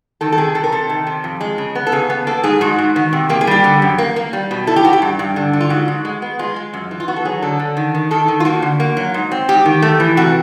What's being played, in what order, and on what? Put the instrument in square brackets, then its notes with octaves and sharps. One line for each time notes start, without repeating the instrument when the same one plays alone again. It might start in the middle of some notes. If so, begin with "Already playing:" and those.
[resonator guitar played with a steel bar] D#3 A4
A4
C3 G#4
C3 A4
A#4
C3 A4
D#3
C3
F2
G#3
C#3
B3
A4
C#3 G#4
B3
A#3 A4
G#2 G#4
G#2 F#4
G#2
D#3
C3
A#3 G4
G#4
G3 G4
D3
F#2
A#3
A#3
G3
B2
E4 A4
G4
E4 F#4
G4
G2
G2
D3
D3
F4
G#2 F#4
G#2
G#3
B3
G#3 F4
G#3
F#2
E3
F4
B3 F#4
A4
F#3 G#4
D3 A4
D3
D#3
D#3
D#3 A4
D#3
F4
A#3 F#4
D3
A#3
F#3
G#2
C4
G#2 G4
D#3
A3
E3
C3 F#4